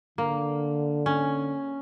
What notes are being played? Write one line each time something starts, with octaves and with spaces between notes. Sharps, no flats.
D3 A#3
C#4